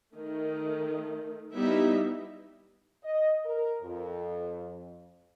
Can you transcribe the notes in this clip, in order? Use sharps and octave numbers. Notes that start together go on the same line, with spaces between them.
D#3 A3
G3 B3 D#4 E4 E5
D#5
A#4
F2